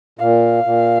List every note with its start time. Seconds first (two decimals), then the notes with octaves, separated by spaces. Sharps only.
0.19 A#2 F5
0.64 A#2